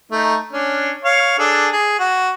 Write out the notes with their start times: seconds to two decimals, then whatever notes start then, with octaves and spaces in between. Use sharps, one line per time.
0.11 A3 D#4
0.53 C#4 D4
1.04 C#5 F5
1.39 D4 G#4 A4
1.73 G#4
1.99 F#4